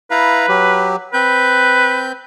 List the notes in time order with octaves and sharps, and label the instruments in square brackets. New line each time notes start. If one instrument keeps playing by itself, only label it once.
[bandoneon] E4 F5 A#5 [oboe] B4
[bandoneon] F#3 G4
[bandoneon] C4 G6 [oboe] B4